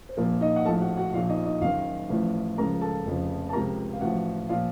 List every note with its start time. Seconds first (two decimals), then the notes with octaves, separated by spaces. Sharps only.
0.09 C5
0.17 A#1 A#2 F3 A#3 A#4
0.41 D#4 D#5
0.56 F#5
0.65 A#1 A2 F3 A4 A5
0.81 F#4 F#5
0.97 F#4 F#5
1.13 A#1 A#2 F3 F4 F5
1.29 D#4 D#5
1.45 D#4 D#5
1.61 F#1 F#2 D#3 F4 F5
2.09 A1 A2 F3
2.58 C#2 C#3 F3 A#4 A#5
2.81 A4 A5
3.05 F1 F2 C#3 F3
3.49 A5
3.53 C#2 C3 F3 A#4 A#5
3.93 F5
4.01 A1 A2 F3 F#4 F#5
4.49 A#2 F3 F4 F5